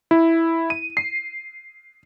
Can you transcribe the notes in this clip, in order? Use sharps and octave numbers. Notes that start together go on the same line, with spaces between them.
E4
D#7
C7